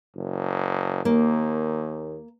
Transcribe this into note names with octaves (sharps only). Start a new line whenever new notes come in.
F#1
D#2 A#3